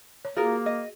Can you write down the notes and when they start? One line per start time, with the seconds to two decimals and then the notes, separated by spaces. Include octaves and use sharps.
0.25 C#5
0.37 A#3 F4 F#4 G#4 A#4
0.66 D#5